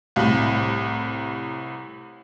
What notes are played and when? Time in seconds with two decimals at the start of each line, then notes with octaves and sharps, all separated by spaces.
0.16 C2 A2